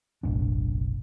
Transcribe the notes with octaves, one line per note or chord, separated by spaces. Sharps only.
F#1 B1 A2 D4